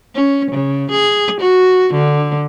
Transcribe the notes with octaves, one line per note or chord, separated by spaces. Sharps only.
C#4
C#3
G#4
F#4
D3